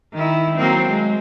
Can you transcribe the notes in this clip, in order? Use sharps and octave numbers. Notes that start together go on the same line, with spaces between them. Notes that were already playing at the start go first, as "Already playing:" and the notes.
D#3 E4
F#3 A#3 C4
G#3